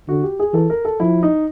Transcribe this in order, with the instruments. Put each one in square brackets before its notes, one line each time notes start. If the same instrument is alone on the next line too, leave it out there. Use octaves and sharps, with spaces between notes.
[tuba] D3 [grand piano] F#4
[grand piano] G4
G#4
[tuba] E3 [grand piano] A4
[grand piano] A#4
A4
[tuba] F3 [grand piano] E4
[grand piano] D#4